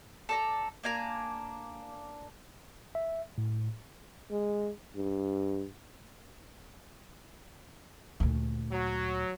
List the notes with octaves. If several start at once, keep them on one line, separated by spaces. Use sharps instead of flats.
A4 D5 A#5
A#3 D4 G#5 A#5
E5
A2
G#3
G2
D2 A#2
F#3